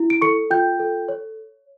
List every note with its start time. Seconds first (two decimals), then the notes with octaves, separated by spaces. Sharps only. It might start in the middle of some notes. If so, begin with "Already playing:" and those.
Already playing: E4
0.10 D7
0.22 A4 C#6 C#7
0.50 F4 G5 G6
0.79 A4
1.09 C#5